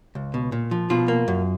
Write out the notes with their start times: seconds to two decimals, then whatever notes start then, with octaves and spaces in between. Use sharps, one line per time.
0.15 C#2
0.34 B2
0.52 A#2
0.71 F3
0.90 B2 F4
1.08 A#3
1.28 F#2